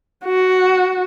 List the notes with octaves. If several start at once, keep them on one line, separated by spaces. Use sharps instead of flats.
F#4